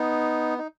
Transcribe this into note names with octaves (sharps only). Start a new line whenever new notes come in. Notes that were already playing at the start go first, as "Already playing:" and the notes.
Already playing: B3 D#4
D#4